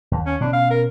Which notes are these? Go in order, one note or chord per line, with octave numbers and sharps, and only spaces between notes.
D#2
C#4
B2 C#4 D4
F5
A#4